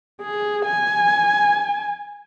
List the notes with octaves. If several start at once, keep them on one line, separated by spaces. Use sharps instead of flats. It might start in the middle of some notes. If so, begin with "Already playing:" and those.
G#4
G#5